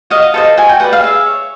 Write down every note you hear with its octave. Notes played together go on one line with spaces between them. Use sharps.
F#4 D#5 F5
A4 C5 D#5
F#4 G#5
G5
B4 D5 F#5
F5
G#4 E5
C#5